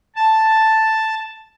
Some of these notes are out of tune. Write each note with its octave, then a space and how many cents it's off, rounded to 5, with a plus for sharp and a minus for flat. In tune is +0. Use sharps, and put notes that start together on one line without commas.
A5 +0